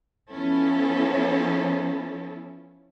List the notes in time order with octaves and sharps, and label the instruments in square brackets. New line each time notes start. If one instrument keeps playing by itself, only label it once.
[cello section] F3 B3 C#4 E4 A4